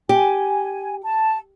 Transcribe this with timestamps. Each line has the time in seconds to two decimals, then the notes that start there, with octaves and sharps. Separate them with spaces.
0.09 G4 G#5
1.02 A5